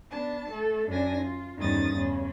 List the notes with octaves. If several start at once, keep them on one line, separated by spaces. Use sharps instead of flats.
B3 D4 A5
A3 A4
F#2 D4 G#5 A#6
F4
E2 G2 D#3 C#4 D#6 A6
E2 C#3 C#4